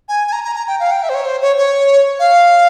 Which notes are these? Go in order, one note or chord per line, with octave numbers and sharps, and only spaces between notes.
G#5
G#5
A#5
A#5
A#5
G5
F5
G5
E5
C5
C#5
C5
C#5
C#5
F5